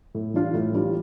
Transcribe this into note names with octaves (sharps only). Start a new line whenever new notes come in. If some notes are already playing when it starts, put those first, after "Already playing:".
A2
E3 G3 D4 F4
A2
E3 G3 D4 F4